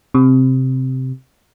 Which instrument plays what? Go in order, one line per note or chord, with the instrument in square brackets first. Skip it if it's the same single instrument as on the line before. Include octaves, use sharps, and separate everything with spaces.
[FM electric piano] C3